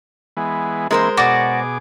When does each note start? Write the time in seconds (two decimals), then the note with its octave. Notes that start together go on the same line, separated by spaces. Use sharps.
0.37 E3 G#3 B3
0.91 E3 G#3 A#3 C4 A#4 C5
1.17 B2 F#4 G#4 D5 D6